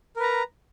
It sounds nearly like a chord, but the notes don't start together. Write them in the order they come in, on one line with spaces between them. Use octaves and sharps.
A#4 B4 A#5